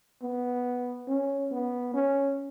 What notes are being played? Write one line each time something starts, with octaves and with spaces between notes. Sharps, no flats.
B3
C#4
B3
C#4